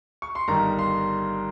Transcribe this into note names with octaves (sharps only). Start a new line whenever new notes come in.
C#6
C6
G1 G2 D#3 G3 A#5
C6